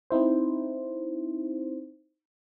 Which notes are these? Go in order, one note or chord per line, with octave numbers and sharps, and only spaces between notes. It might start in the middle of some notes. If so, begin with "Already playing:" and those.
C4 D#4 E4 C5